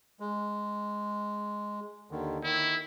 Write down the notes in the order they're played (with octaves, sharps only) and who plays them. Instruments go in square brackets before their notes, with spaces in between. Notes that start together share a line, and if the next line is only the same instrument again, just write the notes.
[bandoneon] G#3
D#2 D3 D#3
[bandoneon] D#3 [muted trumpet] E4